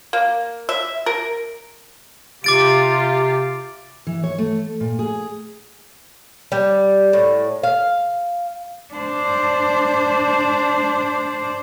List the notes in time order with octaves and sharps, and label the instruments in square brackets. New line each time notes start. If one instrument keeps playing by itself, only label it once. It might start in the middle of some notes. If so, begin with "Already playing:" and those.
[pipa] A#3
E5
A#4
[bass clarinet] C3 [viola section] F4 G4 [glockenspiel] D6 A6 D7
[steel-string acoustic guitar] E3
C#5
A3
A#2
G#4
[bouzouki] G3
A2
F5
[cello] D4 C5